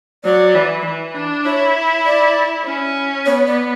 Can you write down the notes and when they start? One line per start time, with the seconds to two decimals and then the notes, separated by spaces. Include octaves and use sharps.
0.24 F#3 D5
0.55 E3
0.84 E3
1.14 D4
1.45 E4 C#5
2.06 D5
2.65 C#4
3.26 B3 C#5
3.47 D5